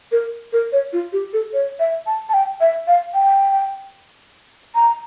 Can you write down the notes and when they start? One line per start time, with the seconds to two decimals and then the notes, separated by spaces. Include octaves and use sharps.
0.12 A#4
0.53 A#4
0.72 C#5
0.93 F4
1.13 G4
1.33 A4
1.53 C#5
1.80 E5
2.07 A5
2.29 A5
2.34 G5
2.61 E5
2.87 F5
3.14 G5
4.75 A#5